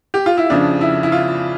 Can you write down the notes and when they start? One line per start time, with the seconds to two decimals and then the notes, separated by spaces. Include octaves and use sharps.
0.14 G4
0.26 F4
0.37 E4
0.50 F2 C#3 F3 D4
0.81 E4
1.03 E4
1.12 F4